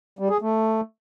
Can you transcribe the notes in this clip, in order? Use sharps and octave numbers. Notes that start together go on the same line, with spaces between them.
G3
G#4
A3